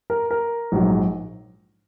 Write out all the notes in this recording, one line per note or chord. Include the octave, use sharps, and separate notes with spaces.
A#4
A#4
A#1 G#2 F#3